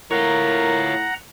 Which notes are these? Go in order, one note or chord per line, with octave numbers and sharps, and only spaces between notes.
A2 F4 A#4 C#5 F#5 A#5